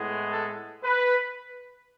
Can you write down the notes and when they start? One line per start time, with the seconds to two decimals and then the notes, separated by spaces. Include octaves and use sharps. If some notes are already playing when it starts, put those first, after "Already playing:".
Already playing: A2 G#3 B3
0.31 A4
0.84 B4